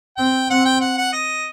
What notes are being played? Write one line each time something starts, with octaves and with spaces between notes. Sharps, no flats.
C4 G5
C4 F#5
G5
F#5
F#5
D#5